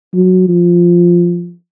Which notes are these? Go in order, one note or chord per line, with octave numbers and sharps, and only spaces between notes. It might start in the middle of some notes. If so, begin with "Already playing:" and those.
F#3
F3